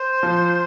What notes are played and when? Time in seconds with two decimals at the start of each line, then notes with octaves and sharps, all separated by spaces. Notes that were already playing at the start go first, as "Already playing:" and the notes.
Already playing: C5
0.23 F3